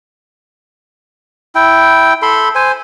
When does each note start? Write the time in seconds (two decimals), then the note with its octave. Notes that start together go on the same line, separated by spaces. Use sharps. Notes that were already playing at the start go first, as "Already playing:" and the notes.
1.55 E4 G5
2.22 A4 B5 C6
2.55 C5 G#5